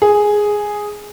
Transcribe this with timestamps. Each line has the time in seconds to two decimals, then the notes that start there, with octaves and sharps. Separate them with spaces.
0.02 G#4